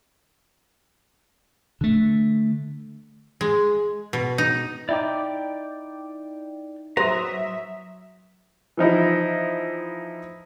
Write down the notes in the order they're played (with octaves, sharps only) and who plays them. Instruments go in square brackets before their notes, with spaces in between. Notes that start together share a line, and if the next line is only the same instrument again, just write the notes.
[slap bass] D3 A3
[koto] G#3
B2
D#4
[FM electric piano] D#4 E4 [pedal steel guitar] D5 G5 D6
[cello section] F#3 E5 [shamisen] B4 C5 [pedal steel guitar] A#5 D#6
[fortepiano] E3 F3 D#4 E4